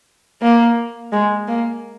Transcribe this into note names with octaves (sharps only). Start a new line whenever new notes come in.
A#3
G#3
A#3